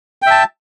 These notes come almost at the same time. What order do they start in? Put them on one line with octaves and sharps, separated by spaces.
G5 E5 A5